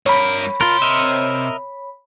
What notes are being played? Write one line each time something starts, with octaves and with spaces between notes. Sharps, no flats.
G2 A#4 C#5 B5
C3 F4 A#4 C6
A#4 D#5 E5